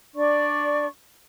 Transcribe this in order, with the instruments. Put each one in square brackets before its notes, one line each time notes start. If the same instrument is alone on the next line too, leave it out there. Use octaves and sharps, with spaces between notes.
[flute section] D4 D5 C#6